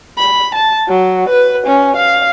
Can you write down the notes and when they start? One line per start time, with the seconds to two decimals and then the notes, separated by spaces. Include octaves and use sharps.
0.18 B5
0.55 A5
0.88 F#3
1.29 B4
1.66 C#4
1.97 F5